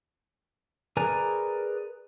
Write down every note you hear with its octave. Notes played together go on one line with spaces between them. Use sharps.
G#4 A#4 B4 D5 G#5 A#5